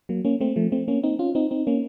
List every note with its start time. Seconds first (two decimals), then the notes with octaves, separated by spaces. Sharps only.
0.09 F#3 A#3
0.25 A#3 C#4
0.40 A3 C4
0.56 F3 A3
0.72 A3 C4
0.88 A#3 C#4
1.03 C4 D#4
1.19 C#4 F4
1.35 C4 D#4
1.51 C4 D#4
1.67 A#3 C#4